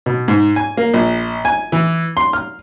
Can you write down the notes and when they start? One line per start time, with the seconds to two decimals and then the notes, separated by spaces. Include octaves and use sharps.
0.06 B2
0.28 G#2
0.56 G#5
0.77 A#3
0.94 A#1
1.45 G#5
1.72 E3
2.17 C6
2.33 F6